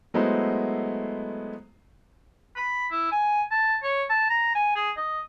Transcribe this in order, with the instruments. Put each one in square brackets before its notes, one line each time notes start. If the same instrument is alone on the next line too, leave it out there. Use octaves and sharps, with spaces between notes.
[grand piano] F#3 G#3 A3 B3 E4 C5
[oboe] B5
E4
G#5
A5
C#5
A5
A#5
G#5
G#4
D#5